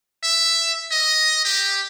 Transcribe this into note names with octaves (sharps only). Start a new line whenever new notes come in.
E5
D#5
G4